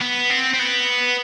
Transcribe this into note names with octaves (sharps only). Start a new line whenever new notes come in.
B3
C4
C4
B3